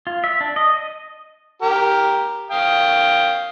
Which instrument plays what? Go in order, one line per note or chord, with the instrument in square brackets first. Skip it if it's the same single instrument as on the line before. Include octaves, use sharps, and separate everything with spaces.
[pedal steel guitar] F4
E5
D4
D#5
D#5
[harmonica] G4 A#4
F5 G5 D#6